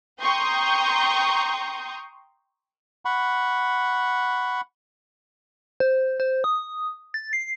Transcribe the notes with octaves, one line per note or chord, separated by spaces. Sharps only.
G5 A#5 C6 C#6 D#6 G6
F#5 B5 C#6
C5
C5
D#6
A6
C7